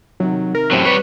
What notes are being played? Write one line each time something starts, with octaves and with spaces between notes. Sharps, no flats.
C3 D#3 F#3
A#4
F#2 A2 F#3 C4 G4 C5
G3 B4 C#5